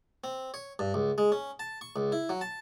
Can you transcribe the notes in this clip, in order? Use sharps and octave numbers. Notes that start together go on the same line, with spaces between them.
C4
C#5
G2
C#2
G#3
C#4
A5
C#6
C#2
E4
F#3
A5